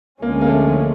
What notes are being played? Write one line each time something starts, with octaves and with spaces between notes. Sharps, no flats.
D2 D3 F3 G#3 A#3 C#4
A#3
A3